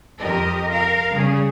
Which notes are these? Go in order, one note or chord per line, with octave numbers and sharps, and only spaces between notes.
F2 G4 A#4 D#5
A#4 F5
C#3 G3 G#4